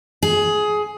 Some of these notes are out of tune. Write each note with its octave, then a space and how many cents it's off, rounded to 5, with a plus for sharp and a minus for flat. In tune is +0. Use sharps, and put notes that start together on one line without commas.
G#4 +15